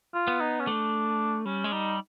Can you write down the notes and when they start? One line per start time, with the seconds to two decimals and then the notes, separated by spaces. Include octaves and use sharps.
0.14 F4
0.28 B3
0.41 D#4
0.60 C#4
0.67 A3 D4
1.45 G3 C#4
1.64 G#3
1.72 G3 D#4